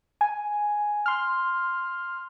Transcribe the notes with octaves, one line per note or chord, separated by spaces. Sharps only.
G#5
C6 F6